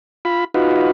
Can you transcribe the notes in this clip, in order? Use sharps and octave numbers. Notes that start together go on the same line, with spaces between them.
F4 B5
D#4 F4 F#4 B4